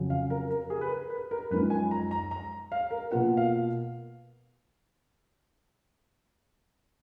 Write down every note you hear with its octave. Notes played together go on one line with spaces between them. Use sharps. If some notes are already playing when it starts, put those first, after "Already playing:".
Already playing: F2 C#3 F#3
F5
A#4
A#4
G#4
B4
A#4
B4
A#4
F#2 F3 G#3 D#4 B4
G#5
A#5
A#5
A#5
F5
A#4
B2 A#3 F4 B4 F#5
F5